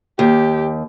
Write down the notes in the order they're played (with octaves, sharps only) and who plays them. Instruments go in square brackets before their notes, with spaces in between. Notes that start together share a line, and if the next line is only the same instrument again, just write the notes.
[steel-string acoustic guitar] D#2 [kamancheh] G4